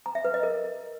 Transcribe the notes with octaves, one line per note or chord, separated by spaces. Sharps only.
A#5
E5
B4
D#5
A#4